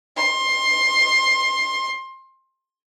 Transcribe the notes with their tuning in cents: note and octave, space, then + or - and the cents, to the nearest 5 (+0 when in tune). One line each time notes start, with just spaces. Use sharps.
C6 +20